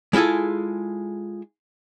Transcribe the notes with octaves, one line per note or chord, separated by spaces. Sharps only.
G#3 E4 F4 G#4 A4